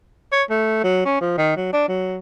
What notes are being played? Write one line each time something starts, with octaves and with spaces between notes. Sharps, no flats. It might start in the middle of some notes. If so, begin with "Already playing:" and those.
C#5
A3
F#3
C#4
F3
D#3
F#3
D4
F#3